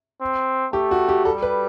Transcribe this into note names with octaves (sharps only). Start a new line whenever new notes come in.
C4
A3 G4
F#4
G4
G3 A4
B4